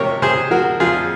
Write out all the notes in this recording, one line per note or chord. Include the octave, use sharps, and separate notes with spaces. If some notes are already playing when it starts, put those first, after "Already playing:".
Already playing: C3 F3 A#4 C#5
C3 G#4 C5
F3 F#4 A#4
F2 F4 G#4